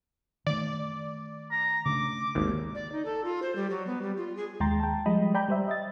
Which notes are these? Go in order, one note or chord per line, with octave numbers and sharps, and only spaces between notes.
D#3 A3 D5
A#5
C#3 A3 D4 D6
G#1 D#2
D5
D#4
A4
F4
C5
G3
F#3
B3
G3
F4
G#4
D#2 G#3 G5 A#5 C6 A6
G5 A5
F3 G3 G#3 D#5 B5 D#6
D5 G5 A#5 B5 G6
G3 C5 E5
D#5 E5 A6